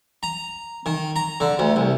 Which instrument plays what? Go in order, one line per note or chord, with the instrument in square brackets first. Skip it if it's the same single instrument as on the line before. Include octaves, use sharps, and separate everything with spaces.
[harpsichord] A#5
D#3
A#5
D3
D2
C2